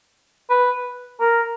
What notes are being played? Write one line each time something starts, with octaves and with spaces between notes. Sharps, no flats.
B4
A#4